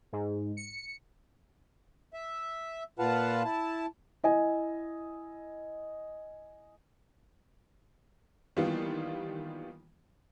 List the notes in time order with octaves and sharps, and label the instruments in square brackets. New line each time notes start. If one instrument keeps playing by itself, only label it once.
[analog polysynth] G#2
C#7
[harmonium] E5
A#2 F4 B4 F5 F#5 A5
E4 A5
[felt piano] E4 D#5 G#5
[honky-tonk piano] D#3 E3 G3 A#3 B3 F4